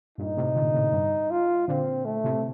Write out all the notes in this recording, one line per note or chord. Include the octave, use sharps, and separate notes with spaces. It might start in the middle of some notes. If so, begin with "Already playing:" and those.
G2 A#2 D#4
A2 C3
A#2 D3
A2 C3
G2
F4
A#2 D3 C4
A3
A2 C3